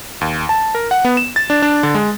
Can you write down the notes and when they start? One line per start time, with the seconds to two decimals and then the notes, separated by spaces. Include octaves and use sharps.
0.21 D#2
0.49 A5
0.75 A#4
0.91 F#5
1.05 B3
1.17 E7
1.36 A6
1.50 D4
1.62 D4
1.83 D3
1.95 G#3